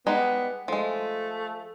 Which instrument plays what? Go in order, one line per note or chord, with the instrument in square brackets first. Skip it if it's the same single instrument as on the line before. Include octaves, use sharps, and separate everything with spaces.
[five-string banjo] G3 G#3 D#4 [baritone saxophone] B3
[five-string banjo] F3 G#3 [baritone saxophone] A3